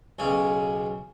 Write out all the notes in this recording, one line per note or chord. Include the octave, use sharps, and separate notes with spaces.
B1 C#3 C#4